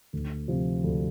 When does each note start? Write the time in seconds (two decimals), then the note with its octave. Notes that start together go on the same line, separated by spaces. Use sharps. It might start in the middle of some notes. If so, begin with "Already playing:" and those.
0.13 D2
0.48 C3 F3 C4
0.84 D2